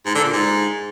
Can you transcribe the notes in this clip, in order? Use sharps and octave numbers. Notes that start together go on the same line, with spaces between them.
G#2
D3
A#2
G#2